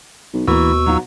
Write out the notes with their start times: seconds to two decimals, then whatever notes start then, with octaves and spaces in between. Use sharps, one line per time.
0.33 B1
0.47 D#2 B2 E3 A#3 C#6 E6
0.86 F#3 D#4 F4